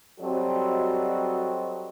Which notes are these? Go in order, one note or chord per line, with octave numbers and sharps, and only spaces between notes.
F#3 G3 C4 F#4 A4 D#5